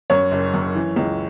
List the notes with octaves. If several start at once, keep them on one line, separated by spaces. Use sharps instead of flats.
F#2 C#5
F#1
F#2
E3
C#2